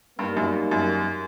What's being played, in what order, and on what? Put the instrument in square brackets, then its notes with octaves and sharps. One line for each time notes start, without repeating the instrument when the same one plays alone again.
[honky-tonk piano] G2 [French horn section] G3 A#3 D#4
[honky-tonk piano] F#2
F#2